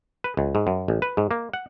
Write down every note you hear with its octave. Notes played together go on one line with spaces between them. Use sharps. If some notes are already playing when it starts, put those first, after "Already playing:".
B4
C#2
G#2
F#2
A1
B4
G#2
A#3
F#5